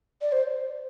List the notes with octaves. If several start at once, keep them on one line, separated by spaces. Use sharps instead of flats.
D5
C5